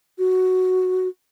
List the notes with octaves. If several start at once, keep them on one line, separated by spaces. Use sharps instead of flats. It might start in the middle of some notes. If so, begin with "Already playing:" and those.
F#4